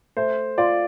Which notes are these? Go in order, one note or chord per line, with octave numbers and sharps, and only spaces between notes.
A3 C5
F4 D5